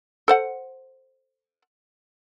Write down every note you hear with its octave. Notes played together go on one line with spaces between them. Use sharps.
A4 C5 F#5